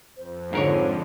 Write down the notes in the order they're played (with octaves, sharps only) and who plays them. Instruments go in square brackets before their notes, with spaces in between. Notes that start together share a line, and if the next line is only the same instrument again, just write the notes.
[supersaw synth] F2 [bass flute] C5
[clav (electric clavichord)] G#2 A#4 C#5 [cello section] D3 G#3